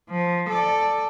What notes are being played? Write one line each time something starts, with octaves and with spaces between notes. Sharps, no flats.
F3
A4 D5